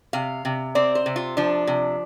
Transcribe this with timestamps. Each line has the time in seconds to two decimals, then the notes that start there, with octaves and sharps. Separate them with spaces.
0.13 C3 F5
0.45 C3
0.75 C4 D5
0.95 C5
1.06 C3
1.16 F4
1.37 F3 D4
1.67 C3